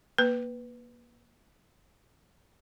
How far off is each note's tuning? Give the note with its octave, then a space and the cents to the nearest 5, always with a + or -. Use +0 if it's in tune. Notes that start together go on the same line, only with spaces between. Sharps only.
A#3 +25 B4 +0